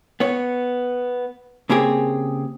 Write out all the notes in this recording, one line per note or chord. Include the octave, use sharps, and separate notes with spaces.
B3 C#5
C#3 A#3 C4 G4 G#4